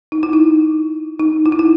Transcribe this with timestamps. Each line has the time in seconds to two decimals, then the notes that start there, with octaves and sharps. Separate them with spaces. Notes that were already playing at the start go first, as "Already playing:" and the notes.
0.12 D#4
0.23 E4
0.33 D#4
1.20 D#4
1.46 E4
1.52 D#4
1.59 E4